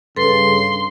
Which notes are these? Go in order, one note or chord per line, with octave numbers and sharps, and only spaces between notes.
G2 C#3 A4 B4 C6